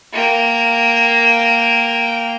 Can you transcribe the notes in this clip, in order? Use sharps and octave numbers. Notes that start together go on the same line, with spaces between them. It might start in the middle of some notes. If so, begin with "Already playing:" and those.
A#3 G5